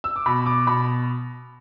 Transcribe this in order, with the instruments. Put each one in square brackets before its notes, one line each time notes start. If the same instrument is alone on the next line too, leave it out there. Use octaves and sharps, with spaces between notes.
[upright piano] E6
D6
B2 B5
D6
B2 B5